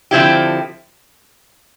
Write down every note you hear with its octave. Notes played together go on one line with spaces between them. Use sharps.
D3 F3 C4 E4 G4